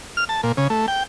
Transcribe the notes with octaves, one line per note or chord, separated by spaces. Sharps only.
F6
A5
A#2
C#3
A3
G5